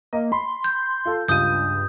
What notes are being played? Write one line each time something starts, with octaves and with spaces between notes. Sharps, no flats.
A#3 D#5
B5 C6
G6
F4 A4
C#2 G2 F4 D#6 G6 D#7